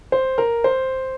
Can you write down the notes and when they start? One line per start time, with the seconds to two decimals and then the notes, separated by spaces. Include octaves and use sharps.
0.12 C5
0.38 A#4
0.64 C5